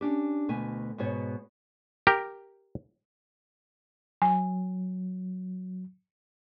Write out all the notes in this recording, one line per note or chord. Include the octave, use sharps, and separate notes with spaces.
C#4 D4 G4
D2 B2 A3 G#5
G#2 B2 B3 C#5
G4 A#4
F#3 G#5